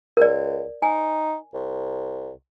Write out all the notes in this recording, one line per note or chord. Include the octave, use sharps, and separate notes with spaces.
C#2 A#4 D5
D#4 G#5
C2